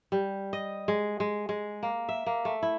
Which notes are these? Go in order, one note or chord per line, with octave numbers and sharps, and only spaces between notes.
G3
D#5
G#3
G#3
G#3
A#3
E5
A#3
A3
E4